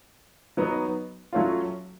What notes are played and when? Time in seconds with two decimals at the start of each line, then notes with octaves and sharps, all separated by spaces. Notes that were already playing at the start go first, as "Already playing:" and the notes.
0.57 F#3 B3 D#4
1.33 F#3 A3 C#4 F4